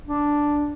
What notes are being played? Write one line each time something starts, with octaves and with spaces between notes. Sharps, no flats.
D4